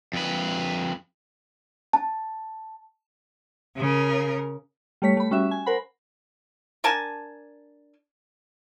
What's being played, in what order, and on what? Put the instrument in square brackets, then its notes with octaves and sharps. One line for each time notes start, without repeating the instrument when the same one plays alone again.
[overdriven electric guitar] F2 B4
[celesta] A5
[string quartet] C#3 A#4
[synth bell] G3 A3 C#5 B6
A3 B5
G3 C#4 F#4 E5
G#5
A#4 C5 F#5 B5
[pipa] D4 A#4 G#5 A5